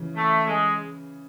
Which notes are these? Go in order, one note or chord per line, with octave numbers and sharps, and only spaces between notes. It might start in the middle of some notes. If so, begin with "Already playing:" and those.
Already playing: C#3 E3
A3
G#3